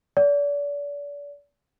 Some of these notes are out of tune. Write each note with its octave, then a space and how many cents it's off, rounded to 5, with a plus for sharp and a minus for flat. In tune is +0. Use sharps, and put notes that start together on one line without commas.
D5 -35